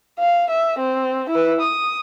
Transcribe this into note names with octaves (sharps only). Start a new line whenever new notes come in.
F5
E5
C4
E4 B4
D#6